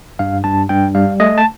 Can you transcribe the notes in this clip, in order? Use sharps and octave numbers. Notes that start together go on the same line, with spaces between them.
G2 F5
G2 A5
G2 G5
G3 F5
A3 D#5
A5